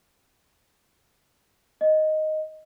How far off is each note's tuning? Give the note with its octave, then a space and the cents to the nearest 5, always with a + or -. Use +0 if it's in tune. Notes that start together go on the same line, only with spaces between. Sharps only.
D#5 +0